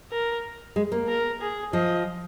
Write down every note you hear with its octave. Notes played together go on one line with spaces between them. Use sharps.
A#4
G#3
A#3
A#4
G#4
F3 D#5